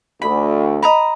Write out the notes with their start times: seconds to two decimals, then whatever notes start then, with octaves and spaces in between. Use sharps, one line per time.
0.22 D2 B5
0.83 D#5 A#5 B5